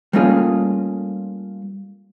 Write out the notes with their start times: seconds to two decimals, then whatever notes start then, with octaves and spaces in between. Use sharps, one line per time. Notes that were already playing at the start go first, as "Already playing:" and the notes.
0.13 G3 A3 A#3 C#4 F4 G#4